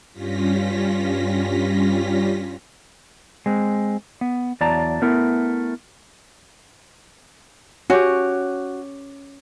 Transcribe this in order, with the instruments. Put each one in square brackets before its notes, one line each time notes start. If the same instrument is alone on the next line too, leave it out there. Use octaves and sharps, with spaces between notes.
[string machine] G2 G3 C#4 F4 A#6 B6
[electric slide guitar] G#3 C4
B3
E2 F#3 D5 A5 A#5
A3 B3 E4 A#4
[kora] C#4 G4 [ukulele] F#4